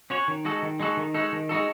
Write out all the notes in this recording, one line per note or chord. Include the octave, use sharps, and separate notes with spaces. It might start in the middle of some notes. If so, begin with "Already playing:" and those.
C#4 F#4 C#5
D#3
G#3 D#4 F#4 A4
D#3
G#3 D#4 F#4 A4
D#3
G#3 D#4 F#4 A4
D#3
G#3 D#4 F#4 A4